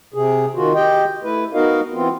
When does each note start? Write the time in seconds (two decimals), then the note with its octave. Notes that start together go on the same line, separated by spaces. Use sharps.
0.14 C3 G#4
0.55 D#3 F4 F#4
0.74 G4 D#5 G5
1.24 A3 E4 B4
1.54 B3 D#4 F#4 A#4 D#5 F5
1.94 E3 B3 C4 F4